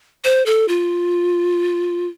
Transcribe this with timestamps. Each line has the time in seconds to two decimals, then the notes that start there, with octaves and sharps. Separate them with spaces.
0.24 C5
0.46 A4
0.68 F4